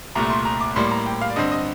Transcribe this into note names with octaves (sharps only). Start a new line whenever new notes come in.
C2 A#2 A3 A#5
C6
A#5
D6
A2 G3 A#3 C6
A#5
G5
F5
D5
G2 D3 G3 C4 D#5
D#5